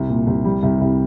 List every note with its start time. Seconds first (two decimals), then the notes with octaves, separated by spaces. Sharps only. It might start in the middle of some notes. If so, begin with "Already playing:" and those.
Already playing: C2
0.09 A#2
0.27 C2
0.45 G3
0.63 C2
0.81 C2